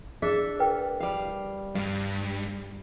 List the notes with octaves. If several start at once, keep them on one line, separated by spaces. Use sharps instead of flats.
D4 G#4 A4 E5
A#4 B4 G5
G3 F5
G2 F5